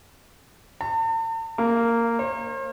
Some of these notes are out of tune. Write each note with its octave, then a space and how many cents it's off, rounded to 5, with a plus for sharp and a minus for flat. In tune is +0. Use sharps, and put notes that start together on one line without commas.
A5 +45
A#3 -10
C5 +45